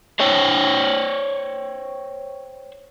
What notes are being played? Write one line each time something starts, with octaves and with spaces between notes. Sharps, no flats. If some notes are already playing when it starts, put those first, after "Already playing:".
C5 C#5 G5